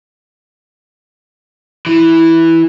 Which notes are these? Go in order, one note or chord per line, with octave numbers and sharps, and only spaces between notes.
E3